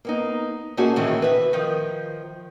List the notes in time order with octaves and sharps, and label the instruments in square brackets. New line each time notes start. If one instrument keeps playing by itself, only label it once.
[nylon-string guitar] A#3 B3 D#4
A3 A#3 C#4 D#4 F#4 G#4
D#2 A2 C3 D#3 E3
B4 E5
D#3 F3